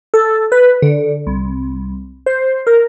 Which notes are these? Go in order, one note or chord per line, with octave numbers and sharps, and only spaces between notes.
A4
B4
D3
C2
C5
A#4